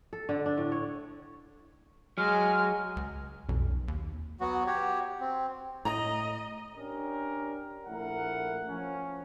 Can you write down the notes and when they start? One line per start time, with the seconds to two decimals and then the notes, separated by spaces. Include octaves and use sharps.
0.13 A4
0.29 D3
0.46 D4
0.58 A2
0.72 C#5
2.18 F#3 G#3 F6
2.96 C#2
3.49 B1 F2
3.88 D#2
4.40 F#3 B3 F#4
4.67 F#4 G4 C#5
5.20 C4
5.85 A2 D#5 A#5
6.77 C#4 D4 G4 A#4
7.86 A#1 A3 E4 A#4 F#5
8.68 F3 C#4